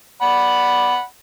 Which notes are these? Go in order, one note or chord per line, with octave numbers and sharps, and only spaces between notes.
D5 F#5 B5